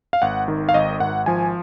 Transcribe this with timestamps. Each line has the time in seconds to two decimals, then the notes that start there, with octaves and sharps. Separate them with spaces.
0.13 F5
0.22 G#1 F#5
0.48 D#3
0.69 F5
0.74 G#1 D#5
1.00 G#1 F#5
1.26 F3 G#5